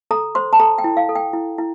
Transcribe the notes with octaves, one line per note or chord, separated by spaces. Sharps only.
A4 A#5
C5 C6
A5
A4 A#5
G5
E4
F5
A4
G5
E4
E4